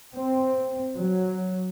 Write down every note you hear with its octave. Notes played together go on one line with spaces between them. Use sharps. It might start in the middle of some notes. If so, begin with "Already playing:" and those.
C4
F#3